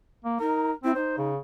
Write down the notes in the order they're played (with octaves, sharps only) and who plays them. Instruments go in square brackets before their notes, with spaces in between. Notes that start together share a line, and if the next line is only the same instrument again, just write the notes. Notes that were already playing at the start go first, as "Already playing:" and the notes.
[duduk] A#3
[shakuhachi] D#4 [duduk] A#4
[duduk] C4 [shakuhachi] E4
[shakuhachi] D#4 [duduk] C5
[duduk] C#3